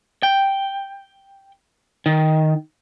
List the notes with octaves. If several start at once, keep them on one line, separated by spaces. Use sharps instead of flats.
G5
D#3